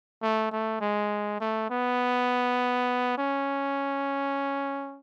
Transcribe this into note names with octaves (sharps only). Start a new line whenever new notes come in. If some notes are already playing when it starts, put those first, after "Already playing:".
A3
A3
G#3
A3
B3
C#4